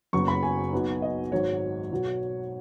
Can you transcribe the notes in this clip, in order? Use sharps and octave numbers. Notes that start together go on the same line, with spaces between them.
F#1 F#2 C#3 B3 C#6
B5
G#5
B1 B2 F#3 B3 D#4
D#5
G#1 G#2 F#3 C#5
B2 F#3